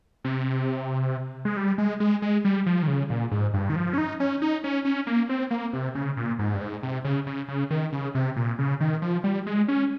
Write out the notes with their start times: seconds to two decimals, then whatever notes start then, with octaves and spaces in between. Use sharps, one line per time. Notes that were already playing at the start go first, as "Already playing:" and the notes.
0.25 C3
1.45 G#3
1.57 G3
1.78 G#3
2.00 G#3
2.22 G#3
2.45 G3
2.66 F3
2.83 D#3
2.88 C#3
3.10 A#2
3.31 G#2
3.54 G2
3.70 D#3
3.76 F3
3.93 C#4
3.98 D#4
4.20 C#4
4.42 D#4
4.64 C#4
4.85 C#4
5.07 A#3
5.29 C4
5.51 A#3
5.73 C3
5.95 C#3
6.17 A#2
6.39 G#2
6.54 G2
6.61 G#2
6.83 C3
7.05 C#3
7.27 C#3
7.48 C#3
7.70 D#3
7.93 C#3
8.15 C3
8.36 A#2
8.59 C#3
8.81 D#3
9.02 F3
9.24 G3
9.46 G#3
9.68 C#4